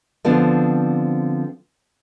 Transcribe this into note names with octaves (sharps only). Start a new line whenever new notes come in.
D3 F3 B3 C4 D4